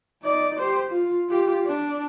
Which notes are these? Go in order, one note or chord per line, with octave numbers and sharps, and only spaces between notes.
D#4 D5
G4 C5
F4
F4 G4
D4